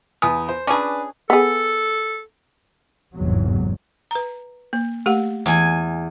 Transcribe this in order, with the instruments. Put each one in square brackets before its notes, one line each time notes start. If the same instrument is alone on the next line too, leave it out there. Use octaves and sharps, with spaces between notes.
[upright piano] E2 D#6 [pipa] B3 [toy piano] G#5
[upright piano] C5
[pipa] C#4 G#4 [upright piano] D4 B4 [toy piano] F4 A5 D6
[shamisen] B3 G#4 [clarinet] A4
[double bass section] G1 E2 G#2 C3 F#3
[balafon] B4 A#5
A#3
A3 G4 F#5
[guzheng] E2 G#5